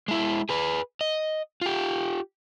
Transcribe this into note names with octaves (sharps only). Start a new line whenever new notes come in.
G#3 E4
G#4 B4
D#5
F4 G4